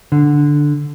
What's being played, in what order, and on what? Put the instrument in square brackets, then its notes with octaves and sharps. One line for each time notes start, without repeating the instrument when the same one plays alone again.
[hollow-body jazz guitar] D3